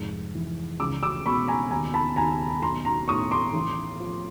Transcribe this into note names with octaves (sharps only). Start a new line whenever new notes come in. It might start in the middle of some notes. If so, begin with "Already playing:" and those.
Already playing: F1 G#2
E3
C#2 D6 E6
D6 E6
B2 B5 C#6
G#5 A#5
D#2 G#5 A#5
A5 B5
D#2 G#5 A#5
B1 A#5 C6
A#5 C6
A2 C#6 D#6
C6 D6
A1
F3